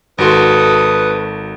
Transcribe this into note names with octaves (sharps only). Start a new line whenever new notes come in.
G#1 F#4 A4 B4 C6 D#6